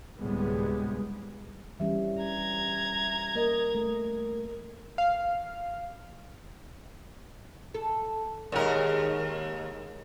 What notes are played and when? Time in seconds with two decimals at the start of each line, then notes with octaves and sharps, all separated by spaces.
0.19 D2 A2 C3 G3 G#3 B3
1.80 E3 G3 C#4 E5
2.22 A#5 G#6
3.35 A#3 A#4 D#5
3.75 A3
4.98 F5
7.74 A4
8.52 D#2 D#3 G#3 A#4